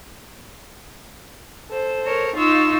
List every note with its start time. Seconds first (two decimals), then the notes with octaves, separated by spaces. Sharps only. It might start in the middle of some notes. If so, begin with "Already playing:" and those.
1.70 A4 C5
2.06 A#4 C#5
2.36 D#4 F4 C#6 E6